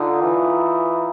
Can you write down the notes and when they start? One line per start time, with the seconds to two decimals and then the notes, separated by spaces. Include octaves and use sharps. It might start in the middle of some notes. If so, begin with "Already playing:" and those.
Already playing: D3 D#4 F4
0.23 E3